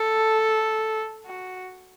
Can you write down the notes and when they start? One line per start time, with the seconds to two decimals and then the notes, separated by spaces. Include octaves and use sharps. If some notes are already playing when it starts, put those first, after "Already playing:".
Already playing: A4
1.26 F#4